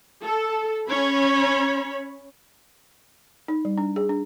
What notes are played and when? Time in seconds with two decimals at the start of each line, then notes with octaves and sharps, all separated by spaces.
0.23 A4
0.89 C#4 C#5 B5
3.48 D#4
3.65 G3
3.78 D4
3.96 G#4
4.09 D4